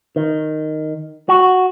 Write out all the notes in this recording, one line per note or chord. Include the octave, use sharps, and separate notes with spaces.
D#3
F#4